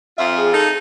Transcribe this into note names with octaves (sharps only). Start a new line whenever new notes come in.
F2 F4 E5
G#4
D#4 A4